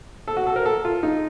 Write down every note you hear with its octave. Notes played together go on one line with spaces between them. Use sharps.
A4
F#4
A4
A#4
A4
F4
D#4